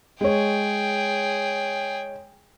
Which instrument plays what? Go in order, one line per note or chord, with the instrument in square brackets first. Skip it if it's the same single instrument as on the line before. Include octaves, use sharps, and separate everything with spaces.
[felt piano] G#3 C#5 [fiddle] G#4 G5